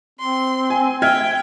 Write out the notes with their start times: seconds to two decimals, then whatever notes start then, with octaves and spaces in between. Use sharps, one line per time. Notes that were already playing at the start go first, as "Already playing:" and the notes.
0.20 C4 C6
0.70 G#5
1.02 E5 G5 F6 G#6